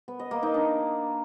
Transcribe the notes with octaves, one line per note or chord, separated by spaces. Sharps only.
B3
D#5
A#3
D#4
D4